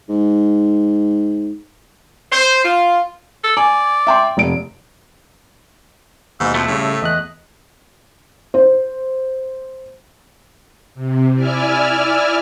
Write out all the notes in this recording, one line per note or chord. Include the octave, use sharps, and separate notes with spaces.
G#2
C5
F4
A4
D5 G#5
E5 G5 C6
F1 D7
D#2 G#2 B2 E5
F2 A3
A2 C#3 G3
E2 D#5 F#6
C5
C3
E4 D5 E5 G#5 F6